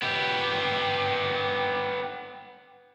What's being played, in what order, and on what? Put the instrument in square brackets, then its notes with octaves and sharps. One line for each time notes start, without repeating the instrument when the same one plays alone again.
[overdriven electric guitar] B3 G4